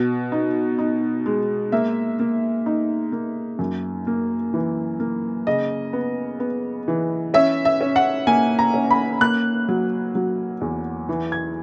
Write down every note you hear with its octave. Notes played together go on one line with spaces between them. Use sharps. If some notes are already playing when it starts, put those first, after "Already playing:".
Already playing: B2
D#4
D#4
G#3
A#3 E5
A#3
D#4
A#3
F#2
A#3
E3
A#3
C#3 D#5
B3
B3
E3
C#4 E5
E5
C#4
F#5
A#3 G#5
A#5
C#4
B5
A#3 F#6
F#3
F#3
E2
E3
G#6